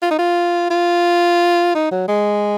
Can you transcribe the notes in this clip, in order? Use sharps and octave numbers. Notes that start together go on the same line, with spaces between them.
F4
D#4
F4
F4
D#4
F#3
G#3